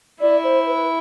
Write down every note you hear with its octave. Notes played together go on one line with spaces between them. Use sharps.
E4 D5
C5
B4